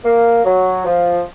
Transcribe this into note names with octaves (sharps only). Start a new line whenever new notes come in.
A#3
F#3
F3